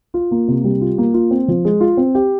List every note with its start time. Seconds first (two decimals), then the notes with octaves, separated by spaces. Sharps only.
0.14 F4
0.31 A#3
0.48 C3
0.64 G3
0.81 F4
0.98 A#3
1.14 F4
1.31 C4
1.48 F3
1.65 G#3
1.80 F4
1.97 C4
2.15 G4